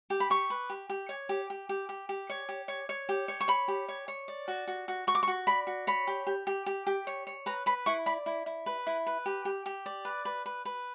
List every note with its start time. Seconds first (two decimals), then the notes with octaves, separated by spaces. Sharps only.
0.10 G4
0.20 B5
0.30 G4 C#6
0.50 B4
0.70 G4
0.89 G4
1.09 C#5
1.29 G4
1.50 G4
1.69 G4
1.89 G4
2.09 G4
2.30 C#5
2.49 G4
2.68 C#5
2.89 C#5
3.09 G4
3.28 C#5
3.41 C#6
3.48 C#5 B5
3.68 G4
3.88 C#5
4.08 C#5
4.28 D5
4.48 F#4
4.67 F#4
4.88 F#4
5.07 F#4 C#6
5.15 D6
5.23 C#6
5.28 F#4
5.47 D5 B5
5.67 F#4
5.87 C#5 B5
6.07 G4
6.27 G4
6.47 G4
6.66 G4
6.87 G4
7.07 C#5
7.27 C#5
7.46 B4 A#5
7.66 B4 B5
7.86 E4 C#6
8.06 D5 B5
8.26 E4
8.46 E4
8.66 B4
8.87 E4
9.06 B4
9.26 G4
9.45 G4
9.66 G4
9.86 D5
10.05 B4
10.25 B4
10.46 B4
10.65 B4